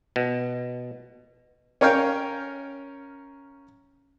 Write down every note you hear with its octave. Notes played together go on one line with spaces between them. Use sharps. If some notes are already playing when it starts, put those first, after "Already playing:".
B2
C#4 A#4 C#5 F5 G5